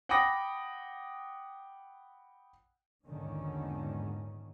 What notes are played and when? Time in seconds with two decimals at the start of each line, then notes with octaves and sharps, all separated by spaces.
0.09 F#5 G5 B5 D6 D#6 A#6
3.06 A#1 E2 G#2 D3 D#3 C#4